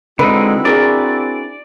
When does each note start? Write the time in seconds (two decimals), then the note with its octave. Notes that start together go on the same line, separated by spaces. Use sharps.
0.19 D3 G#3 C4 D#4 E4 F#4 B4
0.65 D4 G#4 A#4 D5